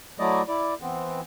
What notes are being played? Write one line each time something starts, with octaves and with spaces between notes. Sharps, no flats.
F#3 A3 E4 D5 D#5
E4 D5
E3 B3 C4